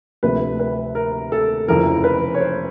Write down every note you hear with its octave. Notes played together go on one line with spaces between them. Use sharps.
D2 C3 F3 A3 B4
B4
A#4
A4
F1 F2 C#3 E3 A#4
B4
C#5
C5